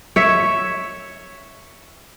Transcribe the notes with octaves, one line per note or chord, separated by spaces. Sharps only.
C#5 E5